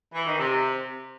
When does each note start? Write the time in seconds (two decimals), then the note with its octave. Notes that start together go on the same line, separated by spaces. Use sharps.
0.14 E3
0.26 D#3
0.38 C3